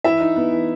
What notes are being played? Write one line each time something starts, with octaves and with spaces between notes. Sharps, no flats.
E3 E4 E5
D#4
B3
E3